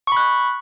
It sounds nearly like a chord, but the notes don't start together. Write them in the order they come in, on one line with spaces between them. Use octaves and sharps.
C#6 B5 F#6